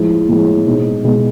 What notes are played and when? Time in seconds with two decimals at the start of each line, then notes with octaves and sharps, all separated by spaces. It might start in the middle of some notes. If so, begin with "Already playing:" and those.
Already playing: A2 F3 G#3 E4
0.29 A2 F3 G#3
0.66 B2 G#3 D#4
1.04 B2 G#3